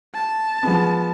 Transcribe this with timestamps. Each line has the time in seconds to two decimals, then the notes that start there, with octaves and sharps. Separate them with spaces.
0.14 A5
0.63 F3 G#3 B3